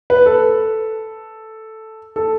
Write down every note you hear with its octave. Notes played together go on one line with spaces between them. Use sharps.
B4
A4
A4